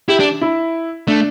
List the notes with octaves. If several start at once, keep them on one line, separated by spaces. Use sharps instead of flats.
E4 G4
D4
E4
A3 D4